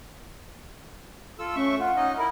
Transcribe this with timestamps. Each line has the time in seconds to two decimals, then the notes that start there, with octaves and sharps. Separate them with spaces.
1.39 F4 A4 E6
1.56 A3 C#4 E5 C#6
1.79 F4 F#5
1.97 C#4 D#4 D#5
2.18 E4 A#4 B5